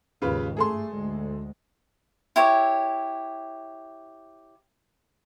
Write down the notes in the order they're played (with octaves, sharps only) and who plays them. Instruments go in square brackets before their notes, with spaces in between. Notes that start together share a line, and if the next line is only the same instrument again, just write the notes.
[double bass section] G#1 D#2 [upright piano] C#3 F4 B4
[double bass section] G2 A3 [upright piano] G#4 A4 C6
[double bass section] D2 G#3
[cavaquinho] E4 G4 C#5